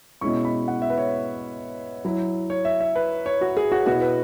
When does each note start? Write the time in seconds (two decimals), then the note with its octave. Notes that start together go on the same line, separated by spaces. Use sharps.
0.21 B2 G#3 C#4 E4 C#6
0.45 B5
0.68 F#5
0.82 E5
0.90 B4
0.98 C#5
2.05 F#3 E4
2.50 C#5
2.65 E5
2.81 E5
2.96 B4
3.26 C#5
3.41 F#4
3.57 G#4
3.72 F#4
3.86 B2 B3 E4 F#4
4.01 B4